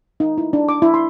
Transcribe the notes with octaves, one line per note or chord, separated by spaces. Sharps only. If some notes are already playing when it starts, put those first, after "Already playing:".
D#4
E4
D4
D6
E4
C6